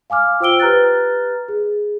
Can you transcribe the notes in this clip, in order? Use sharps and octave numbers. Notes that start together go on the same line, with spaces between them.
F5 G#5 D6 F6
F4 C5 G5 E6 D7 G7
G4 B4 A#5 F6 F#6 A6
G#4